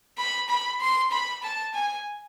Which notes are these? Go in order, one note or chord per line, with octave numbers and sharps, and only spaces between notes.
B5
B5
C6
B5
A5
G#5